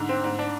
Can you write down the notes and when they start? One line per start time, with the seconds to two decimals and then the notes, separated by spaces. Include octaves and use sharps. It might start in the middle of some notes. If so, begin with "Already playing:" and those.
Already playing: G#2 D3
0.09 C4
0.24 G#2
0.39 D4